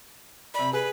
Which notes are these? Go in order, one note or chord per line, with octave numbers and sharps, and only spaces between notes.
C3 D5 B5
G#4 B4